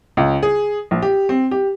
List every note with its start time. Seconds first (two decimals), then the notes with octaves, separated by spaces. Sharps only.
0.17 C#2
0.43 G#4
0.91 A#1
1.02 G4
1.29 C4
1.51 G4